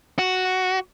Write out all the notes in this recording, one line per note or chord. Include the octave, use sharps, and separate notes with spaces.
F#4